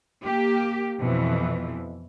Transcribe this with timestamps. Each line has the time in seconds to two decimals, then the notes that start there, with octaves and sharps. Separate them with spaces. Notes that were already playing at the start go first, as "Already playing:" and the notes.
0.24 A#3 G4
0.99 F2 B2 E3